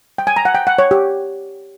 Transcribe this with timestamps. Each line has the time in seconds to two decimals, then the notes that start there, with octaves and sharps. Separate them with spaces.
0.18 G5
0.27 G#5
0.36 A#5
0.45 F#5
0.55 G5
0.67 F#5
0.78 C#5
0.91 G4